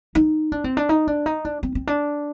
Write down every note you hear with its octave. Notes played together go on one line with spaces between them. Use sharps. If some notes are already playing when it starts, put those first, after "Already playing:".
D#4
D4
C4
D4
D#4
D4
D#4
D4
C4
C4
D4